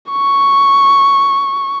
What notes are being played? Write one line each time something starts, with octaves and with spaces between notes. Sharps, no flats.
C#6